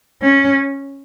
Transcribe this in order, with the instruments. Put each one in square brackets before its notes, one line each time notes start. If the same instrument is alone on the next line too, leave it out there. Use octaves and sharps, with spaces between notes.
[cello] C#4